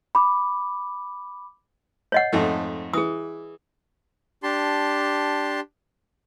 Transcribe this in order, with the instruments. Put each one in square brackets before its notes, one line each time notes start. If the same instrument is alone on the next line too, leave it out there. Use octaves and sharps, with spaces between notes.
[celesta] B5 D6
[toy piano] C#5 D#5 F#5
[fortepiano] F2 G#2 A3
[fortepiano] E3 [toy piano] G#4 D#6
[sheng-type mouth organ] D4 G4 A5 C6